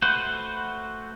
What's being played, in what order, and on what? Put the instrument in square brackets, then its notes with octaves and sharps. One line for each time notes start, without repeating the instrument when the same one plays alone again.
[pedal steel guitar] A3 F#4 B4 C5